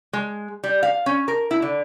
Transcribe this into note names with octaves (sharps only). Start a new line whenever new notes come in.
G#3
G3
F5
C#4
A#4
E4
D3